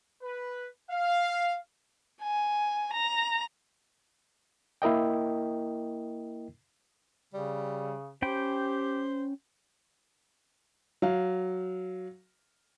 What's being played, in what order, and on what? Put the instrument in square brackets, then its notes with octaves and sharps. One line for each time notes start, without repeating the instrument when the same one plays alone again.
[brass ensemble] B4
F5
[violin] G#5
A#5
[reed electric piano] A#3 E4 A#4 D#5 G5
[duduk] C#3 [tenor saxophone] G3
[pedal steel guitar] C#4 G5 B5 [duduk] G4 [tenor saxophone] C5
[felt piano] F#3 F5